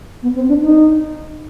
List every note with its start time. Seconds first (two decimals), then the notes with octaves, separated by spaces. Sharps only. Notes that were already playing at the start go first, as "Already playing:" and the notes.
0.23 B3
0.35 C4
0.48 D4
0.61 D#4